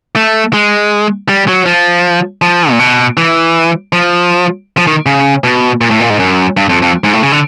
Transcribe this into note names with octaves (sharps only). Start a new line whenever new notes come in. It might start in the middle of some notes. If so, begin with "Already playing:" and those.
A3
G#3
G3
F#3
F3
F3
A#2
B2
E3
F3
F3
D#3
C#3
B2
A#2
A2
A#2
G#2
F#2
G2
F2
F2
G#2
A2
C#3
D3